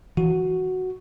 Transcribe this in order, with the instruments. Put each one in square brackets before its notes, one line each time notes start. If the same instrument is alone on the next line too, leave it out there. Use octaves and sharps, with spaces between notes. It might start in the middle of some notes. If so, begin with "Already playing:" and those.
[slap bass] E3 [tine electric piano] F#4